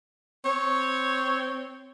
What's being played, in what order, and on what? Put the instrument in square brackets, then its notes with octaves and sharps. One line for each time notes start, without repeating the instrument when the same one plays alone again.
[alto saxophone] C4 [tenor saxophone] C#5